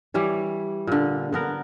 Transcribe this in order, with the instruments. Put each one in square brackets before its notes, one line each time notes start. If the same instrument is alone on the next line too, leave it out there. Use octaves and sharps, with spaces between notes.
[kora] E3 G3 G4 C#5
A#2 D3
D3 B3 A#4